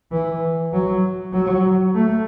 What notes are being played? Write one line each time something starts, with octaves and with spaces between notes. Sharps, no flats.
E3
F#3
F#3
A3